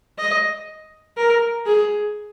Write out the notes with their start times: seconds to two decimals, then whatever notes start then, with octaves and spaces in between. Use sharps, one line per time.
0.18 D#5
1.17 A#4
1.66 G#4